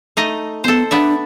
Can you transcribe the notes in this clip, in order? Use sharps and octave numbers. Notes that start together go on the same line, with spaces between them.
A3 D#4 D#5
B3 A4 C5
B3 D4 D5 E5